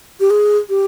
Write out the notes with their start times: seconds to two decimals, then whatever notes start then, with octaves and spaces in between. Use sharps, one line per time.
0.20 G4
0.30 G#4
0.69 G4